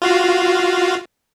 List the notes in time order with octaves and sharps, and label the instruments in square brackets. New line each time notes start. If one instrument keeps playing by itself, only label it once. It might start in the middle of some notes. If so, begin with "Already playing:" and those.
[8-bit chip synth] F4 F#4 F5